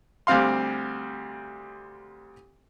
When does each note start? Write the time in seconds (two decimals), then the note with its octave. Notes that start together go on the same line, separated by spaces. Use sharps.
0.27 D2 G3 C4 F5 C6